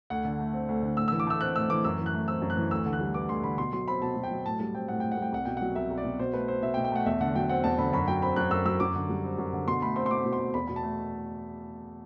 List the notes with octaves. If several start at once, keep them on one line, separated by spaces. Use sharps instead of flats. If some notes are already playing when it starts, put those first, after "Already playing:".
D2 F#5
D3
A3
C4
D2
D3
A2 E6
E3 E6
D6
A3 E6
C4 F#6
A2 E6
E3 D6
F#2 E6
E3
F#6
A3
C4 E6
F#2
F#6
E3
D2 E6
D3
F#6
G3
B3 D6
D2 C6
D3 B5
B2 C6
F#3 C6
C4 B5
B2 A5
B2
G5
F#3
A2 A5
G3 A5
C4 G5
A2 F#5
A2 G5
F#5
G3 G5
C2 F#5
B2 G5
F#3 F#5
C2 E5
C2
D5
B2
B2 C5
A3 B4
C4 C5
B2 E5
G5
B2
G5
A3 F#5
E2 E5
D3 F#5
F#3 G5
C4 F#5
E2 A5
D3 B5
F#2 B5
F#3 G5
C4 B5
F#2 F#6
F#2 E6
F#3 E6
F#2 D6
D3
G3
C4
F#2
D3
B2 C6
A3 B5
C4 C6
C6
B2 D6
B2
C6
A3
E2 B5
B2 B5
A5
A3